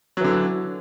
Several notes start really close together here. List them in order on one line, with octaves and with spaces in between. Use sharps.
F#3 E3 D3